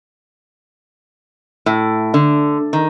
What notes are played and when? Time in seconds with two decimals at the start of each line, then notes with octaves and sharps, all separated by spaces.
1.66 A2
2.14 D3
2.73 D#3